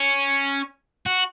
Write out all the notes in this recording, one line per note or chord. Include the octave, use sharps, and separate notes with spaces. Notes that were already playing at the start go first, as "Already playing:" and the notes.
Already playing: C#4
F#4